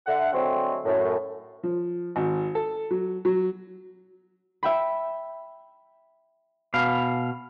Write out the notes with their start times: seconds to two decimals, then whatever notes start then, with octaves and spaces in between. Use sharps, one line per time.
0.07 D3 E5 F#5
0.33 D3 F#3 G#3 A3 C4
0.85 F#2 A2
1.63 F3
2.16 G#1
2.55 A4
2.91 F#3
3.25 F#3
4.63 E5 G5 B5
6.74 B2 F5